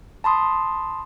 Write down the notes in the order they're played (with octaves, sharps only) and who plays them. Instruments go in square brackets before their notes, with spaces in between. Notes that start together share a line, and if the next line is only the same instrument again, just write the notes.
[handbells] A5 B5 C6 D#6